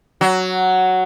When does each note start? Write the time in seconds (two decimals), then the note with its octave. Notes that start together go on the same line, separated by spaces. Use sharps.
0.21 F#3